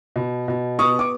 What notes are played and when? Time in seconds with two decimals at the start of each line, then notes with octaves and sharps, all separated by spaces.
0.16 B2
0.48 B2
0.79 B3 C#6 D#6
0.99 D6